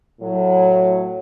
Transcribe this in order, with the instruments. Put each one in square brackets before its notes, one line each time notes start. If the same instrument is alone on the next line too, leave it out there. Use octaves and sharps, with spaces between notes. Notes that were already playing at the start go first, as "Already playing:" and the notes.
[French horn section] A2 F#3